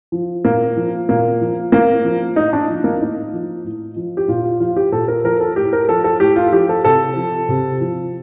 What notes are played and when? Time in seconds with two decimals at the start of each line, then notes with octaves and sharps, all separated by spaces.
0.12 F3
0.44 A#2 A#3
0.77 F3
1.09 A#2 A#3
1.41 F3
1.72 A2 A#3
2.05 F3
2.36 A2 D#4
2.53 D4
2.69 F3
2.84 A#3
3.01 A2 D#4
3.33 F3
3.64 A2
3.96 F3
4.17 G4
4.28 A#2 F4
4.44 F4
4.60 F3 F4
4.76 G4
4.92 A#2 A4
5.08 A#4
5.24 F3 A#4
5.40 A4
5.56 A2 G4
5.73 A#4
5.89 F3 A4
6.04 A4
6.20 A2 G4
6.36 F4
6.53 F3 G4
6.69 A4
6.85 C3 A4
7.16 F3
7.49 C3
7.81 F3